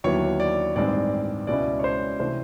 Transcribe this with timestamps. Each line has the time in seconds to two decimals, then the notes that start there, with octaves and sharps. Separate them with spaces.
0.04 D#2 D3 F#3 B3 E4 C#5
0.40 D5
0.76 A1 G2 D#3 G#3 C4 D5
1.47 C#2 B2 G#3 C#4 E4 D5
1.79 C#5
1.84 C5
2.20 C3 E3 A3 D4 C5